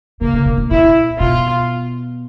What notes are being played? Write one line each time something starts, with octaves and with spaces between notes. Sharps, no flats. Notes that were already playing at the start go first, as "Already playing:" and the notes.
C#3 A#3
C#3
A#2
A2
A#2 E4
B2 F4